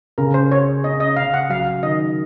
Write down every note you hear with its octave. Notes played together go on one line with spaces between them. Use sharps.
C#3 A#4
C5
G#4 C#5
C#4 D#5
D#5
C#3 F5
F#5
F#3 F5
D#3 D#5